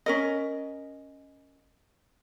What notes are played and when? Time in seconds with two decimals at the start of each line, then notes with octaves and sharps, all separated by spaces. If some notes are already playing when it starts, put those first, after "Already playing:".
0.06 C#4 A#4 D#5